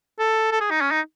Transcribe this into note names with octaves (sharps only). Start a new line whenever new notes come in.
A4
A4
G#4
D#4
C#4
D#4